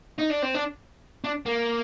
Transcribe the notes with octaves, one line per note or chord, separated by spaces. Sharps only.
D#4
D4
C4
D4
D4
A#3